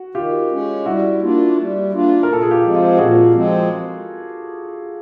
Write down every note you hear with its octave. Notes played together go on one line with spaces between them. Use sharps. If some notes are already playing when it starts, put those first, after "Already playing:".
Already playing: F#4
D#3 F4 G4
G#3 C#4
G3 E4 F#4
A#3 D4 F4
G3
A#3 D4 F4
A#2 A#4
A4
G#4
F4 G4
F3 G#3 C4
F4 G4
A#2 F#4 G#4
F3 G#3 C4